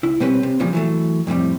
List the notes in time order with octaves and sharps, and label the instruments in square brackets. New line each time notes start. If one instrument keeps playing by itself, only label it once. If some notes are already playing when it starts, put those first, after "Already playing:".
[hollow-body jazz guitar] C#2 E4
B2 G3 C4 C#4 B4
C3
D#2 A#2 C#3 F3 G3
E3 F#3 A3
F2 A2 C3 G3